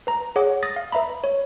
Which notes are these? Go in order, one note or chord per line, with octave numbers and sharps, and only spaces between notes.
B4 A#5
G#4 C#5 F#5 D6
D#6 A6 A#6
F5
B4 E5 A#5 B5
C#5